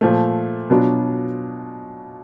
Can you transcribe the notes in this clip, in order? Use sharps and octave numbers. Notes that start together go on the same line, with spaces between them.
A#2 F3 A3
B2 F#3 B3 D4 F4